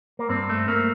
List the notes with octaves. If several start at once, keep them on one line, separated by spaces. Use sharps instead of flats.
A#3
G2 C4
A3
A3 A#3